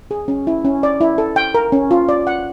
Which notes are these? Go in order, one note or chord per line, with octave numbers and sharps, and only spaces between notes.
G#4
C#4
E4
C#4
D5
E4
A4
G5
A#4
C#4
F4
D5
F#5